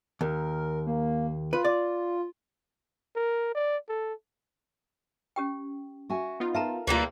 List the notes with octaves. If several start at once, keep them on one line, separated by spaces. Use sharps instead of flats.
D#2 A#4
A#3
F4 B4
D5
A#4
D5
A4
C#4 G4 G5
F#4 E5 G#5
B3 D#4 F4
A4 A#4 E5 F5 A5 A#5
D2 E3 G3 A#3 F4